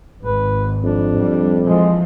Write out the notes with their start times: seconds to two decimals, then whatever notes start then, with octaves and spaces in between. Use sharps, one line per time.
0.23 G#1 B4
0.84 F2 D4
1.18 G3
1.66 E3 F3 G#3